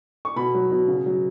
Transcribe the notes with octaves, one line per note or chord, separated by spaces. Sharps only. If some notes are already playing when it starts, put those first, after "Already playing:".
C#6
B2 B5
F#3
B2
C#3
F#3